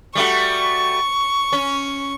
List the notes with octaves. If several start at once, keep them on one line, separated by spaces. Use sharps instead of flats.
G3 A3 F#4 C#6
C#4